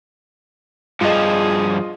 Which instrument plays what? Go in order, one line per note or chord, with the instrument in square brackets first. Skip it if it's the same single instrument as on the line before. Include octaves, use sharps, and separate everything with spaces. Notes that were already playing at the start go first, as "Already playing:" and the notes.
[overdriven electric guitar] G2 F3 [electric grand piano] F4 D#5 [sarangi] G#4